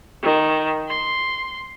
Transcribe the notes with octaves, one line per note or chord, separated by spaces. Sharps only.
D#3
C6